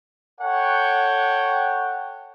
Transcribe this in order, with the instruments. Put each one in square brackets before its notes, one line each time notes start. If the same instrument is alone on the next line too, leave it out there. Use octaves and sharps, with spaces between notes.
[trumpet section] A4 C#5 F#5 G5